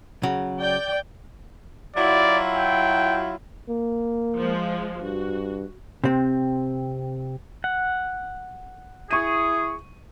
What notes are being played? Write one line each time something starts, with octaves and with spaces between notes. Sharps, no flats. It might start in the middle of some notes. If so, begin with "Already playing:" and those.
C#3 F#3
D5 G5
F#3 E4 F4 D5
G5
A#3
F3 G#3
G2 F#4
C3 C4
F#5
E4 G#4 C#6 D#7